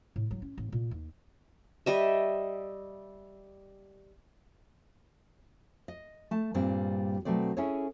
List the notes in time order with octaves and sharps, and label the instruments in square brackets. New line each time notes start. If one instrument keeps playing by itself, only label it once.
[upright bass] A2
F#3
C#4
A1
A#2
D#2
[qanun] G3 D#5 E5
[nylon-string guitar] D#5
A3 A5
G2 A#2 G3 G#3 C4 G5
B2 F#3 A3 C4 D5
C#4 E4 G#4 A4 C#5